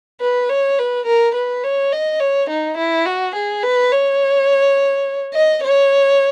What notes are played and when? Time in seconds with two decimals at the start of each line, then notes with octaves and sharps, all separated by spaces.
0.21 B4
0.50 C#5
0.79 B4
1.06 A#4
1.35 B4
1.64 C#5
1.93 D#5
2.20 C#5
2.50 D#4
2.77 E4
3.05 F#4
3.35 G#4
3.63 B4
3.91 C#5
5.34 D#5
5.63 C#5